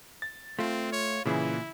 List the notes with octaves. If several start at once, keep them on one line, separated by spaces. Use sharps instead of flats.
A6
A3 C4 F4
C#5
A#2 C#3 E3 E4 G#4